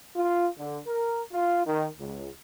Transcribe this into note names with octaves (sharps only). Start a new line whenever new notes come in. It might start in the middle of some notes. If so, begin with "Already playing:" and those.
F4
D3
A#4
F4
D#3
C#2